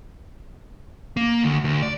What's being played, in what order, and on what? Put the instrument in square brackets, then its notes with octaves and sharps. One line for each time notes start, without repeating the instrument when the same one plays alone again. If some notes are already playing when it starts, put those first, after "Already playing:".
[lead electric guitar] A#3
D2
D2
D5